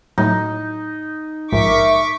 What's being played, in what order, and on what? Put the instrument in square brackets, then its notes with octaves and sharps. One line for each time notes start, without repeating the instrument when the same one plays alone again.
[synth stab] A2 F#3 [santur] D#4
[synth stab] A#1 G#2 [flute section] A#4 E5 [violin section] C#6 D6 B6